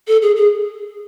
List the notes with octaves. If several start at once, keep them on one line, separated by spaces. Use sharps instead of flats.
A4
G#4
G#4